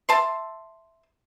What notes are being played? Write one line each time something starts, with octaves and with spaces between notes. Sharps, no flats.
E5 A5 C6